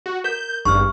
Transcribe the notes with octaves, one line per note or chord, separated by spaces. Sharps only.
F#4
A#4 G6
G#1 G2 C#6 F6